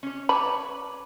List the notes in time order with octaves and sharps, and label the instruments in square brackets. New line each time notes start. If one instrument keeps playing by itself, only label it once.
[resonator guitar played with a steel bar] C#4 C#5
[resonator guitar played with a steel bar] B4 C#5 D5 [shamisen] A5 B5